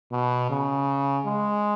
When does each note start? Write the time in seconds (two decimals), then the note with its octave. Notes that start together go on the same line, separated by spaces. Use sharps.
0.12 B2
0.50 C#3
1.25 G#3